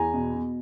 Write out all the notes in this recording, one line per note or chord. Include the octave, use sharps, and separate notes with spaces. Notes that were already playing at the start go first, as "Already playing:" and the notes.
Already playing: E2 G#5 A#5
B2
B2